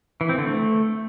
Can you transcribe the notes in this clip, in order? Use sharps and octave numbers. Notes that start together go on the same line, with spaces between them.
E3
C4
D3
A3